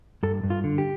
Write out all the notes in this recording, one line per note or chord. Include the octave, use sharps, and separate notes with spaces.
G2 A4
G2
F4
D3
G4